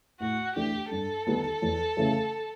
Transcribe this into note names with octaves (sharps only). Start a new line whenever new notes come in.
A2 F#4
E3 A3 D4 G4
G2 A4
D#3 G3 B3 D#4
E2
C#3 E3 A3